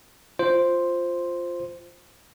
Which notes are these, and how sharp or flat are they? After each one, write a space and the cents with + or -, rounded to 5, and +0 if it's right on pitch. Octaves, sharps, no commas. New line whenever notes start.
F4 +0 C5 +0